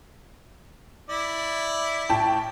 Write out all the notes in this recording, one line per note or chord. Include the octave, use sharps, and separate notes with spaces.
E4 D5
A2 G5 A5